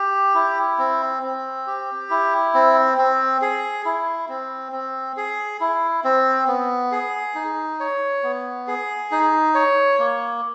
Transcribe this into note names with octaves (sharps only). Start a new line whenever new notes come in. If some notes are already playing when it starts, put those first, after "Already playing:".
Already playing: G4
E4
C4
C4
G4
E4
C4
C4
G#4
E4
C4
C4
G#4
E4
C4
B3
G#4
D#4
C#5
B3
G#4
D#4
C#5
A#3